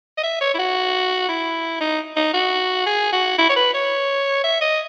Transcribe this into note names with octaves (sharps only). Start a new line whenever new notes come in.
D#5
E5
C#5
E4
F#4
E4
D#4
D#4
F#4
G#4
F#4
E4
C#5
B4
C#5
E5
D#5